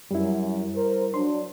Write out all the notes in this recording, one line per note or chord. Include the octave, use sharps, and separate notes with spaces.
F#2 G3 E4
A#4 C5
F#3 D4 C6